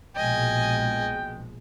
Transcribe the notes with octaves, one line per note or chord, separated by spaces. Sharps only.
A#1 B2 G#3 D#5 G5 G#5